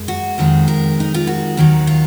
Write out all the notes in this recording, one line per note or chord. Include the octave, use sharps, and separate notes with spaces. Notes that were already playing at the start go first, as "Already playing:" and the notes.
Already playing: F#2 G#3
F#4
F2 D#3 G#3
A#4
D#4
F4
F#4
D#2 D#3 F#3
F4